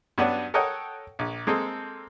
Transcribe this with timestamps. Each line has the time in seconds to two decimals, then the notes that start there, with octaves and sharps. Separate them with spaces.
0.18 G2 F#3 B3 C#4 D4
0.54 A4 A#4 C#5 D#5 F#5 G5
1.19 A#1
1.47 G#3 A#3 C4 A4 D#5